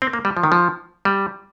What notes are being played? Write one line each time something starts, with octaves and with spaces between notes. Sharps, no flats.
C4
A#3
G3
F3
D#3
F3
G3